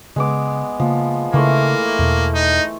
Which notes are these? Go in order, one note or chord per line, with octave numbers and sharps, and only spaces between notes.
C#3 G#3 B3 D6
C#3 F3 A#3
C#3 E3 A3 A#3 C6
E2 B2
D#4